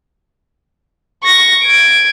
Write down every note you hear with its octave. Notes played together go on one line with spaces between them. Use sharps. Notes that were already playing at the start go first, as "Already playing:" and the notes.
C#6 A#6
G#6 D7